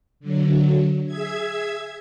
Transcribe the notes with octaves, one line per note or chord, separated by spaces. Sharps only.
D3 F#3
G#4 E5 G#6